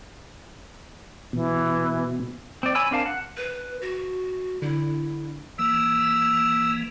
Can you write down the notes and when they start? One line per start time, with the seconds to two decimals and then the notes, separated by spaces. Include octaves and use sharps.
1.33 B2 E3
2.63 C4 D5
2.75 C#5 G#5 B5 E6
2.91 C4 D4 A#4 F5 A5
3.06 F#5
3.37 B4
3.82 F#4
4.62 D3 E4
5.59 E3 A#3 E6